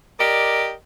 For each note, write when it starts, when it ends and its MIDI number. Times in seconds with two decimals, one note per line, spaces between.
0.19 0.73 67
0.19 0.73 70
0.19 0.73 74
0.19 0.73 75